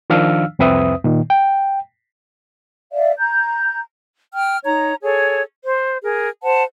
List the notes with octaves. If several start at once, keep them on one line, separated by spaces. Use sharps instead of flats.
D#3 F3 D4 F5 E6 F6
C2 F2 C4 B4 E5 D#6
A#2 D#3
G5
D5 E5 F5
A#5 G6
G5 F6
D#4 C#5 A#5
G#4 A4 C#5
C5
G#4 A#4
C5 F#5 A5